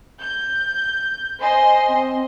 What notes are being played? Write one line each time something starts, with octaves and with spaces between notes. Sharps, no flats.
G6
C5 D#5 G#5 C6
C4